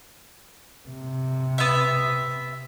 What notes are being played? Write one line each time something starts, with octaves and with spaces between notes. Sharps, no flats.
C3
B3 E5